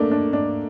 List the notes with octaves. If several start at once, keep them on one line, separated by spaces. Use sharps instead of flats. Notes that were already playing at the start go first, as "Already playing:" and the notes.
Already playing: A3 A#3 D4
D4
D4